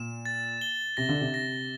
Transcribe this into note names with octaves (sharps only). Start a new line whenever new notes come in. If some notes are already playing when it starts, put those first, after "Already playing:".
Already playing: A#2 E7
A6
G7
C3 A#6
D3
C3
A#6